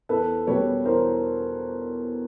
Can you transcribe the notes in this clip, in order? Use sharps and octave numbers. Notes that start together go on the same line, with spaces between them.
E2 A4 B4
B2 G3 B4 C#5
E2 A#4 C5